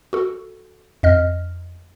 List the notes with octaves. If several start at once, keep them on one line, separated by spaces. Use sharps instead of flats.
F#4 A4
F2 D#5 F6